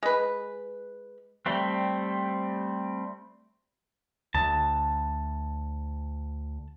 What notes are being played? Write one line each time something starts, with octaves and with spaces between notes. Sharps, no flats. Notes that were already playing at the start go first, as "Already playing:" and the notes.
G#3 B4
G3 A3 C4
D2 A5